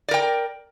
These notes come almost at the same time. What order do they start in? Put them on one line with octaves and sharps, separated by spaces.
D5 A#4 G5